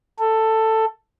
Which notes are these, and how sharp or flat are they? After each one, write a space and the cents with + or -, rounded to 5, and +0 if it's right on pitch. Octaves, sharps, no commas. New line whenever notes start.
A4 +10